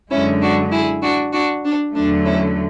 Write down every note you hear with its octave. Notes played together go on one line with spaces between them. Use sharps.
F#2 D3 G#3 C#4 E4
D4 F#4
E4 G#4
D4 F#4
D4 F#4
D4
E2 D3 F#3 A3 D4
C#4 E4